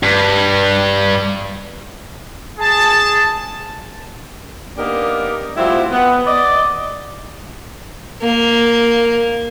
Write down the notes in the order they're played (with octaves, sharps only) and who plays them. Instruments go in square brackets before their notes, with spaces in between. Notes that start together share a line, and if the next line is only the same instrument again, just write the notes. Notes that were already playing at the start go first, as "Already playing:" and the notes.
[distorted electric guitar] G2
[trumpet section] G#4 A5
[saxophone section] A#3 B3 D4 D#4 G4 A#4
F3 G3 A3 C4 E4 F#4
B3
D5 D#5
[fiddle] A#3